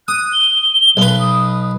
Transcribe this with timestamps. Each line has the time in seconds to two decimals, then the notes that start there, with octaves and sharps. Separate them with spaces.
0.08 D#6 F#6
0.32 G7
0.97 B1 B4
1.20 D#6